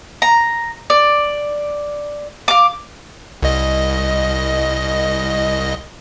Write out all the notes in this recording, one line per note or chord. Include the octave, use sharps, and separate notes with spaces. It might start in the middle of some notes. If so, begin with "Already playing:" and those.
A#5
D5
F5 D6
C2 D#5